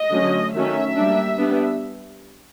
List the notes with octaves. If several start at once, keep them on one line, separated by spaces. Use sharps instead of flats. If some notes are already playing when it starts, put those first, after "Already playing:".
Already playing: D#5
D3 F#3 A3 C#4
D#3 F#3 A3 C#4 E5
G3 A#3 D4
G3 B3 D4